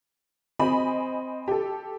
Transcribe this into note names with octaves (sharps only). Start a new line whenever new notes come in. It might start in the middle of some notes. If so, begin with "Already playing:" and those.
C4 D#5 G#5 B5
G4 A4